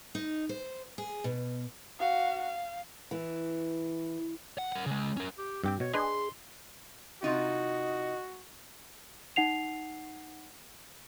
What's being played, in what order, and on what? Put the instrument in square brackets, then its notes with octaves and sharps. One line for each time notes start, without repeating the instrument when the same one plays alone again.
[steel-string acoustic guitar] D#4
C5
G#4
B2
[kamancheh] F#4 F5
F5
[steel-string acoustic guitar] E3
[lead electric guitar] F#5
A#4 F#5
C#3 G#3
C#4 A#4
[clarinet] G4
[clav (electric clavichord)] G2 G4 G5 [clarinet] C4
[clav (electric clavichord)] B2 [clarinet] C#5
[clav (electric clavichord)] D4 B4 D#5 [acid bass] G#4 [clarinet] C6
[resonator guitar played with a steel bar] C3 D#4 F4 [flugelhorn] F#4 [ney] D#5
[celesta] D#4 F#5 C7 F7